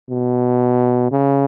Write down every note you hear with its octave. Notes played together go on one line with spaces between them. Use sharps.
B2
C#3